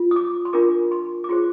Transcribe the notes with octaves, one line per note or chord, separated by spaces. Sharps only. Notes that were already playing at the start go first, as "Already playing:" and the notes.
Already playing: F4
D#6
D6
C6
D4 F4 A#4 D6
C6
D6
F4 G#4 C5 C6